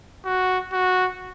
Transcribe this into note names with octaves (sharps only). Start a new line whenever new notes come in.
F#4
F#4